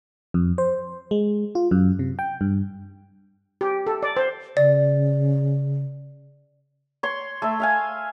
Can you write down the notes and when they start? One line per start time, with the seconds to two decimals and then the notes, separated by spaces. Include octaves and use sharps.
0.34 F2
0.58 C5
1.11 G#3
1.55 F4
1.71 F#2
1.99 C3
2.19 G5
2.41 G2
3.61 G4
3.87 A4
4.03 D5
4.17 C5
4.57 C#3 D5
7.03 C#5 C6
7.42 A3 E5
7.60 E5 F5 G#5